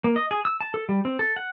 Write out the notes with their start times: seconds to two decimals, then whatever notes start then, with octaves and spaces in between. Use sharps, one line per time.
0.04 A#3
0.16 D#5
0.31 G#4
0.45 E6
0.61 A5
0.74 A4
0.89 G3
1.05 C4
1.19 A4
1.36 F#5